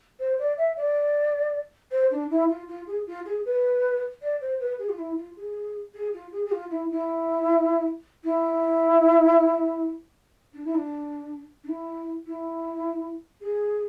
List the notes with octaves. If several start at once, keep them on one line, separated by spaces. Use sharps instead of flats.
C5
D5
E5
D5
C5
D4
E4
F4
F4
G#4
F4
G#4
B4
D5
C5
B4
G#4
F4
E4
F4
G#4
G#4
F4
G#4
G#4
F4
E4
E4
E4
D4
E4
D4
D4
E4
E4
G#4